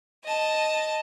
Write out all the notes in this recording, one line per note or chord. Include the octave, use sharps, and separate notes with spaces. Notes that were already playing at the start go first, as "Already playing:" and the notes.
D#5 A5